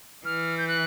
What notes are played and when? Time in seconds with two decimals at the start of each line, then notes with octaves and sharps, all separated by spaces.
0.25 E3 F6
0.58 G6
0.68 F#6